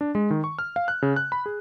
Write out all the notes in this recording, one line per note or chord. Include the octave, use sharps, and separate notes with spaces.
D4
G#3
D#3
C#6
F6
F5
F#6
C#3
F#6
B5
G#4